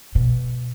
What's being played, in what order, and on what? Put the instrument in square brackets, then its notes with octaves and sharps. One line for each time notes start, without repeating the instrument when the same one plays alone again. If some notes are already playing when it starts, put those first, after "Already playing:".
[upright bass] B2